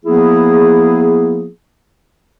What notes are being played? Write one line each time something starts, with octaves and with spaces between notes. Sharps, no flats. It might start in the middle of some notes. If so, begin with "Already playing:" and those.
F3 A#3 B3 E4 G#4